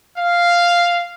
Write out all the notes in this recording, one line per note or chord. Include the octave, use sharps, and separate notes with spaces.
F5